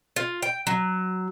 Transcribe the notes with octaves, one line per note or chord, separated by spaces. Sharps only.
F4
G5
F#3